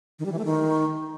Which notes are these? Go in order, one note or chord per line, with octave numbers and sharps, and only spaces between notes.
D#3
G3
E3
A3
D#3